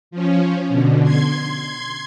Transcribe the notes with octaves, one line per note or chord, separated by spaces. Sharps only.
F3 C#4
B2 D3
C6 G#6